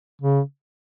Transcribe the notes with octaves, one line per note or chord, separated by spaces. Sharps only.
C#3